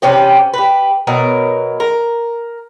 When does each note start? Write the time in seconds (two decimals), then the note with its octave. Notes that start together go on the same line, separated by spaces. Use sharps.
0.02 C3 C#4 G4 B4
0.54 G4 B4
1.07 B2 F#3 A#4
1.80 A#4